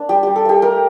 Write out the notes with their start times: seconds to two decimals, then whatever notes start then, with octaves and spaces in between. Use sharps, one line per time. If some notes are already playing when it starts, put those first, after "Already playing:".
Already playing: A#3 D4
0.09 G3 G4
0.23 G3 G4
0.36 A4
0.45 A#3 G4
0.62 A3 A#4